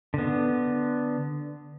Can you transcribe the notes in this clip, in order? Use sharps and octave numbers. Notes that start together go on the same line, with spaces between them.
D3 B3